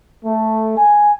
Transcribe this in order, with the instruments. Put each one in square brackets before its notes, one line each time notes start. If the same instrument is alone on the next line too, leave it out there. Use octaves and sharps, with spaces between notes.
[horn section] A3
G#5